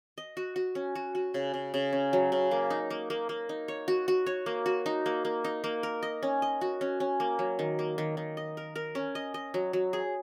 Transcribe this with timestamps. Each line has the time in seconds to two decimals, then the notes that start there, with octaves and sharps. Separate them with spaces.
0.18 D#5
0.37 F#4
0.56 F#4
0.75 C#4
0.95 F#4
1.15 F#4
1.34 C#3
1.54 C#3
1.74 C#3
1.93 C#4
2.13 F#3
2.32 C#3
2.51 A#3
2.70 D#4
2.90 A#3
3.10 A#3
3.29 A#3
3.49 D#4
3.68 C#5
3.88 F#4
4.08 F#4
4.26 C#5
4.46 A#3
4.66 F#4
4.86 D#4
5.06 A#3
5.25 A#3
5.44 D#4
5.64 A#3
5.83 A#4
6.03 D#5
6.23 C#4
6.42 D#5
6.61 F#4
6.81 C#4
7.00 C#4
7.20 A#3
7.39 F#3
7.59 D#3
7.79 A#3
7.98 D#3
8.17 D#3
8.37 D#5
8.57 A#4
8.76 A#4
8.95 C#4
9.15 D#5
9.34 D#5
9.54 F#3
9.73 F#3
9.93 G#4